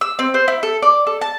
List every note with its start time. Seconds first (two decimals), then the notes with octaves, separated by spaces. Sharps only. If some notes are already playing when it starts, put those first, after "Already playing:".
0.01 E6
0.19 C4
0.34 C5
0.48 E4
0.63 A4
0.82 D5
1.07 A4
1.22 A5